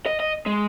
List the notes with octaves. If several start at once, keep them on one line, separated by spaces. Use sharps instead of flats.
D#5
D#5
G#3